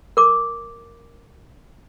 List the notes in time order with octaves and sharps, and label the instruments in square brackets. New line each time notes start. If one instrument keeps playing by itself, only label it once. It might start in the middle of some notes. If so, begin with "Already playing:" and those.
[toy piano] A#4 D6